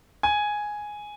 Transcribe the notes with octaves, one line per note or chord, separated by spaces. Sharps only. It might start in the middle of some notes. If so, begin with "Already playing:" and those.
G#5